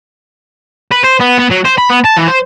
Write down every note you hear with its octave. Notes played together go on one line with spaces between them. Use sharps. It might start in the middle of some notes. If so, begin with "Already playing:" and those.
B4
C5
B3
B3
F#3
C5
B5
B3
A5
E3
C5